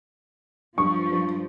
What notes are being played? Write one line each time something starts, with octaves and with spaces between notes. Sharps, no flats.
G2 F3 C#6
G2